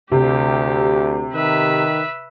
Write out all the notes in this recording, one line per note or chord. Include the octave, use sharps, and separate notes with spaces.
D2 C3 G4
D#3 B4 E5